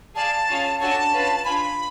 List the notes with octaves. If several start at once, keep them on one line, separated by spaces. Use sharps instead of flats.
G#4 D5 F5 A5
C#4 F4 G#4 C#5 F5
D4 F#4 A4 C#5 G#5 A5
C#4 F4 B4 F5
D4 F4 B4 F5 G#5 B5